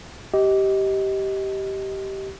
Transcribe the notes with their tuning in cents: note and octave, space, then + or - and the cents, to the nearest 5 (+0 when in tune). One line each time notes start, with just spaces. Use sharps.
G4 -15 D#5 +15